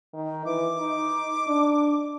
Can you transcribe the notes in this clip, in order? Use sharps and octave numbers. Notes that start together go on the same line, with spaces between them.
D#3
E3 D6
D#4
D4